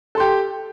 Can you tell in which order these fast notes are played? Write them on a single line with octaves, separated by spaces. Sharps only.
A4 C6 G4